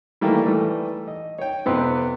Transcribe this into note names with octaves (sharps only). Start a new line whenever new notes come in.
D#3 E3 G3 A3 A#3 E4
E3 G3 A3
D#5
C#5 G5
F2 C3 B3 C4